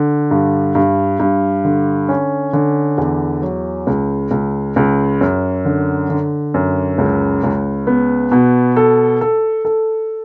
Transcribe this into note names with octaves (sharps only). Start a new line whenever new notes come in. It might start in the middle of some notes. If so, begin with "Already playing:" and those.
Already playing: D3
G2
G2
G2
D3
C#4
D3
E2
F#3
C#2
C#2
C#2
F#2
D3
D3
F#2
C#2
C#2
B3
B2
A4
A4
A4